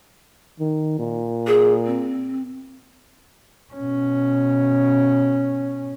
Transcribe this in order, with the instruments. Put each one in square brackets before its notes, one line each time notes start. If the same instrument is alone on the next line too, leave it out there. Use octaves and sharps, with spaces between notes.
[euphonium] D#3
A#2
[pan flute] G#4
C4
[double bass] B2 C#4